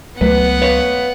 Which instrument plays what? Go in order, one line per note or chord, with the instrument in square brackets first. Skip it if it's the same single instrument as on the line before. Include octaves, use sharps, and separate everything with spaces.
[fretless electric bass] C#2 F#3 A3 [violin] B3 F#5 [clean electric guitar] B4
[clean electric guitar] B4 C#5 F5